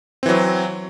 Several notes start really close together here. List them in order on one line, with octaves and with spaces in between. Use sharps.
C4 E3 F#3